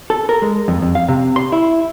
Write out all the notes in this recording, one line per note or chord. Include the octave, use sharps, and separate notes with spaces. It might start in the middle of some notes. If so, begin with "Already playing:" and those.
A4
A#4
G#3
F2
F2
F5
C3
C6
E4